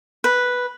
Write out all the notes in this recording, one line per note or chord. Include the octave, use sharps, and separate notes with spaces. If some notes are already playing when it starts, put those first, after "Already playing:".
B4